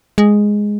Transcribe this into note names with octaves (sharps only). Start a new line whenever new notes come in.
G#3